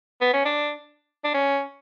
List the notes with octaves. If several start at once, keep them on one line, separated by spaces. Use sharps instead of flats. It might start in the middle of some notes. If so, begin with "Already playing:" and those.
B3
C#4
D4
D4
C#4